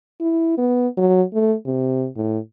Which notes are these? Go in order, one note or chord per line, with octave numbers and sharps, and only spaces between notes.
E4
B3
F#3
A3
C3
A2